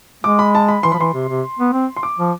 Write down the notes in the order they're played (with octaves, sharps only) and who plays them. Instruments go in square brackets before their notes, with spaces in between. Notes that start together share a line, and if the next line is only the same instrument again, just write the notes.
[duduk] G#3 [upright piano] D6
[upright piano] B5
A5
B5
[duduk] E3 [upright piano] C6
[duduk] F3 [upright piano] B5
[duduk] E3 [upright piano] C6
[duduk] C3
C3
B3
C4
[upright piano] C6
D6
[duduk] F3